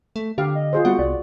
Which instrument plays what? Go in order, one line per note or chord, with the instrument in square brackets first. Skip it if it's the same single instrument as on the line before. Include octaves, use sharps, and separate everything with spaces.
[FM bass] A3
[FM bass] D3 [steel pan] G4 F5
[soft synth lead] D#5
[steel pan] F4 G#4 C5
[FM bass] G3 [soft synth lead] B3 [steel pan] F#4 F#5
[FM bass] C2 [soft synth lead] D5